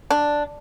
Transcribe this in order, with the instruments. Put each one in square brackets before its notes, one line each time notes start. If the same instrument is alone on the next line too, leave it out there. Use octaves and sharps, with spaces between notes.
[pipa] D4